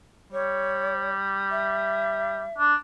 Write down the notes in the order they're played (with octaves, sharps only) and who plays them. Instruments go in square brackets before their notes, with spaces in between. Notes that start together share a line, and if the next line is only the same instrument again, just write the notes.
[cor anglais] G3 [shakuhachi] C#5
[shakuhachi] E5
[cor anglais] D4